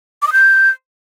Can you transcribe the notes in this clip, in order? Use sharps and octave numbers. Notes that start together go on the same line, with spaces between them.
D6
D#6
G6